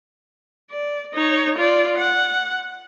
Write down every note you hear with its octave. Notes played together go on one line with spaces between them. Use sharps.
D5
D#4 C#5
F4 D5
F#5